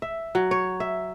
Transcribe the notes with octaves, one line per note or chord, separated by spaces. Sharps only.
E5
F#3
C#5
E5